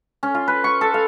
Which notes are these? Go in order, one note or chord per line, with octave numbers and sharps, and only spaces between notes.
C#4
F4
B4
C#6
A4
F5